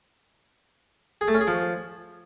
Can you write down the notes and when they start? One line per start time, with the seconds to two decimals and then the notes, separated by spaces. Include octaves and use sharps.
1.21 G#4
1.28 A3
1.34 C#4
1.41 G#4
1.47 F3